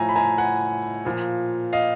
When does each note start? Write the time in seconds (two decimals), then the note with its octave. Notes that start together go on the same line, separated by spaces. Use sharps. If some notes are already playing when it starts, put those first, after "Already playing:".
Already playing: A2 F3 G#5 A#5
0.09 B5
0.16 G#5 A#5
0.38 F#5 G#5
1.05 A#2 F3
1.73 D#5 F5